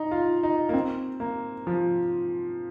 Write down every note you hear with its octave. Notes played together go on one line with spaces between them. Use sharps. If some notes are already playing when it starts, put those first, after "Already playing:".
Already playing: D#4
F4
D#4
A#3
C4
A#3
F3